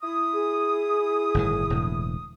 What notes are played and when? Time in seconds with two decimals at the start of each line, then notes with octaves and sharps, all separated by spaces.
0.03 E4 D#6
0.32 G#4
1.34 G1 A2 D#3
1.70 E1 A2 D3